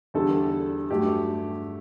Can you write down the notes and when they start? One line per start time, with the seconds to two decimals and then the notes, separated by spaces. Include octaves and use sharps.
0.14 E2 D3 G3 A4
0.90 G2 F#3 A3 G4